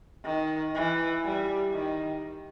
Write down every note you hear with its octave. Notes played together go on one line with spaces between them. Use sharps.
D#3
E3
G3
D#3